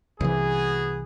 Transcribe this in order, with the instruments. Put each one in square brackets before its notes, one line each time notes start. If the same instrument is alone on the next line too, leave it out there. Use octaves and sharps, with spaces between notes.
[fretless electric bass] C2 E3 [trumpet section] B3 F#4 G#4